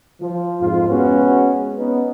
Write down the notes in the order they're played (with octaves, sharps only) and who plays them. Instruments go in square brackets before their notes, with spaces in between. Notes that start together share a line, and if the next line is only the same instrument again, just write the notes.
[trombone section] F3
F2 G#2 F4
G#3 B3 C#4 F#4
B3 C#4 D#4